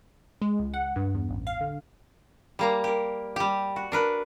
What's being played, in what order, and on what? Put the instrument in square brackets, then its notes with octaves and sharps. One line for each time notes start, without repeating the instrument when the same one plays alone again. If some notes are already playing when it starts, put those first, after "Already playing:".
[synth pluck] G#3
C#2
F#5
G2
E2
A1
F5
D3
[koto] G3 A#3 A#5
G4 A#4
G3 G4
F#4
D4 A#4 B4